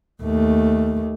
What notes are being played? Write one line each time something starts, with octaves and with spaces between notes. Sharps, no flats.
D#2 A3